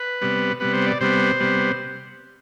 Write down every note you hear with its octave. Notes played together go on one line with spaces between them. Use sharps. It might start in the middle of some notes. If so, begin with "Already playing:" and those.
Already playing: B4
C3 G3 B3
C3 G3 B3 B4
C5
D5
C3 G3 B3 C5
C3 G3 B3